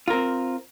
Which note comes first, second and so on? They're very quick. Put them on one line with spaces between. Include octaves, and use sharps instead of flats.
F4 A#4 C4